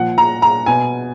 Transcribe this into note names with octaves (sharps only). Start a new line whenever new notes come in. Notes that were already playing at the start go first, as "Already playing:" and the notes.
Already playing: A#2 F3 F#5
A#5
A#5
B2 G#5